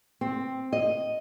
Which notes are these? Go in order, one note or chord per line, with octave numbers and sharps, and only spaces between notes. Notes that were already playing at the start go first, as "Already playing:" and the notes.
C4
D#5